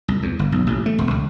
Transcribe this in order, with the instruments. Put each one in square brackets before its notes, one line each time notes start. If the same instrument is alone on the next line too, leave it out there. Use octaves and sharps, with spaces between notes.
[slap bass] C2
E2
G1
B1
A1
A3
E1
C#2